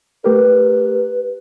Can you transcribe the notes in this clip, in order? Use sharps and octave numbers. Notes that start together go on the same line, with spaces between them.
A3 G4 A#4 B4